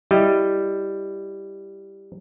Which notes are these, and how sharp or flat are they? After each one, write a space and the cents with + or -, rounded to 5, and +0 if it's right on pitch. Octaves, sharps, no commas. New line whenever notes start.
G3 +0 E4 +0 D#5 +0